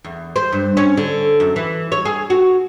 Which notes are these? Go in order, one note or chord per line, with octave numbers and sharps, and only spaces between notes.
E2
C5
G2
C#4
D3
F#2
E3
C#5
G#4
F#4